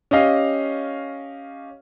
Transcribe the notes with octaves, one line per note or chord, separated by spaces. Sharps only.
C#4 G4 D#5 F5